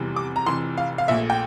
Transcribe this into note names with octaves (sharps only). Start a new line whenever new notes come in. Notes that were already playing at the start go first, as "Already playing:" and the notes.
Already playing: F1 E2 C3 E3 G3
D6
A#5
F1 F2 E3 C6
F5
F5
A#1 A#2 A3 E5
G5